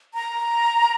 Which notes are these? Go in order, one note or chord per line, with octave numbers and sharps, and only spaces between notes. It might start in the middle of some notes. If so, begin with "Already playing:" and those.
A#5